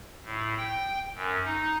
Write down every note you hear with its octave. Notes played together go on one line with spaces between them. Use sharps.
A2
G5
F#2
D#4